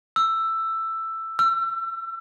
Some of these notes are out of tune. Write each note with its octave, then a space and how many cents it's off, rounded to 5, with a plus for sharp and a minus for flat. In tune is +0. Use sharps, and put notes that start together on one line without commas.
E6 +10
E6 +35